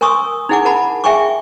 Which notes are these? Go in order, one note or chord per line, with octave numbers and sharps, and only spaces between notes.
A#4 G#5 C6 C#6 D#6 E6
D#4 E4 G#4 F#5 G#5 D6
A#4 F#5 A5 B5
G#4 E5 G5 G#5 C#6 D6